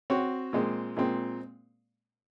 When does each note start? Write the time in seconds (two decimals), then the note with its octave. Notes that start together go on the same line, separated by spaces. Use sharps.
0.10 C4 F#4 C#5
0.53 A#2 G#3 C4
0.97 A#2 G#3 C4